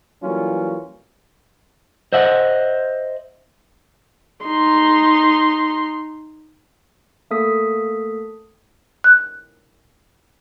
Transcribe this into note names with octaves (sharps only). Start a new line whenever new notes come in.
E3 F#3 G3 A#3 C#4 F4
C5 D#5 E5 F#5
D#4 C6
A3 A#3 A4 D#6 B6
F#6